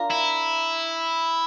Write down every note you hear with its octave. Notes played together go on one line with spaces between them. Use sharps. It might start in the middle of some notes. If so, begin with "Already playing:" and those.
Already playing: D4 F4 A#4
E4